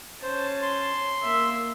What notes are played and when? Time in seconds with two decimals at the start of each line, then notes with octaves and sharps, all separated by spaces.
0.23 C#4 C5 A5
0.62 C6
1.23 A#3 E5